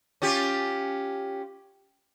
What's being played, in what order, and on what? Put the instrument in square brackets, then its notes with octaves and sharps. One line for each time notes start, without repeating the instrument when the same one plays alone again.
[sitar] C#4 F4 G4